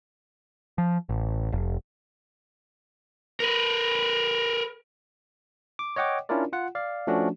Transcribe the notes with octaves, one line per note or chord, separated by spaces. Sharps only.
F3
A1
F1
A#4 B4
D6
C#5 D#5 F#5 G5 D6
C#4 D4 E4 F4 A#4 D5
F4 F#5
D5 F5
F3 A3 C#4 D4 F#4